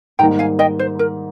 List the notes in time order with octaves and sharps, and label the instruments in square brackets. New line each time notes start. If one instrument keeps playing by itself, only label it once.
[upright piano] G#2 D#3 G3 A#3 D#4 [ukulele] G5 A#5
[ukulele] F5 G#5
D#5 G5
C5
A#4